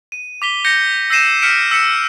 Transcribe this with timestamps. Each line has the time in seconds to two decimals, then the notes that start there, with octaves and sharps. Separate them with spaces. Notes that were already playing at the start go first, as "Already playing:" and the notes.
0.12 D#7
0.42 D6 B6 G7
0.65 G6 A#6 C#7
1.10 E6 G6 A#6 C7 D#7 E7
1.42 F6 G6 B6 C#7 D7 E7
1.71 E6 B6 C#7 E7